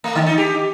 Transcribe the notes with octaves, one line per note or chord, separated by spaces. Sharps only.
A3
D3
D#4
G4